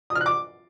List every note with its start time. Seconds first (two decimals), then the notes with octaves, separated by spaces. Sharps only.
0.10 D#6
0.15 F6
0.21 F#6
0.26 D6